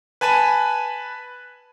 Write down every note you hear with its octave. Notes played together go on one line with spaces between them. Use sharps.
B4 G#5 A5 B5 D#7